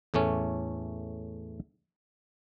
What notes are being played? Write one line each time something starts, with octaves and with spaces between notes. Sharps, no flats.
E2 A2 A3 C#4